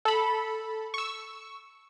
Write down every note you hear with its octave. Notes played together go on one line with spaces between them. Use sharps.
A4 B5
C#6 E6